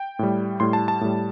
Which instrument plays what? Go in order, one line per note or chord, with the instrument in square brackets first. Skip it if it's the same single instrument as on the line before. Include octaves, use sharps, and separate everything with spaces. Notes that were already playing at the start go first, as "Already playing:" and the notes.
Already playing: [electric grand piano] G5
A2 G3
A2 G3 C6
A5
A5
A2 G3